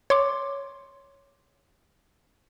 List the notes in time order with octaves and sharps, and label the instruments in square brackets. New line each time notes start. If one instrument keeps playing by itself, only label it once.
[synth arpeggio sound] C#5 C6 D6